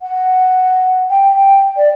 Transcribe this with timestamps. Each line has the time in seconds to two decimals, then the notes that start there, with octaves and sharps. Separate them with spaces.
0.02 F#5
1.10 G5
1.36 G5
1.77 D5